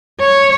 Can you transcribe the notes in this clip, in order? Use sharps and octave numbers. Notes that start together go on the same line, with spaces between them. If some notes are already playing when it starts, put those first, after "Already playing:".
C#5